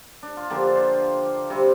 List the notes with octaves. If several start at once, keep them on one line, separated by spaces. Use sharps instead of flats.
D4
F4
D3 F3 A#3 G4
C5
C3 G3 C4